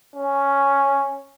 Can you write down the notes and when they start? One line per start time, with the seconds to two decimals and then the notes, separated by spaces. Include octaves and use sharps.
0.16 C#4